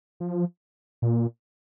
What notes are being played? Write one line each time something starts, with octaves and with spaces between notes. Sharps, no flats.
F3
A#2